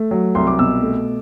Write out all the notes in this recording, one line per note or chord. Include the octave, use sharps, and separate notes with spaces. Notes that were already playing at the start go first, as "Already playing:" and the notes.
Already playing: A3
F#3
C2 C6
D6
B2 E6
A3